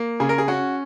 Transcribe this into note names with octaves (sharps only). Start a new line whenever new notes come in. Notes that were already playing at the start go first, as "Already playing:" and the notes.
Already playing: A#3
C#3 G#4
A#4
G#4
C#4 F#4